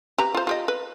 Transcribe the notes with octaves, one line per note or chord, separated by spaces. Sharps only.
G4 B4 A#5
F4 C5
F4 G4 D#5
B4